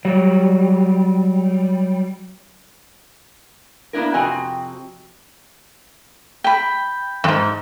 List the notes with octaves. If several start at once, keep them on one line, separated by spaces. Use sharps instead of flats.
F#3 G3
A#3 B3 D4 E4 A#4
F2 C3 C4 F#4 D#5 G#5
G5 B5
F2 G#2